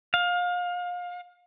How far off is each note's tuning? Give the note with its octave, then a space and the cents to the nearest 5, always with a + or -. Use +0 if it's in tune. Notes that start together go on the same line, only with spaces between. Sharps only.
F5 +30